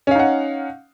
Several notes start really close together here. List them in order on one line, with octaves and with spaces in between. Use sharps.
C#4 F5 D#4 F#5